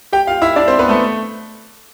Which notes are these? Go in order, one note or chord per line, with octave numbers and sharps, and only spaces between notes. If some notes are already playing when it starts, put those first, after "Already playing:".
G4 G5
F4 F5
E4 E5
D4 D5
C4 C5
B3 B4
A3 A4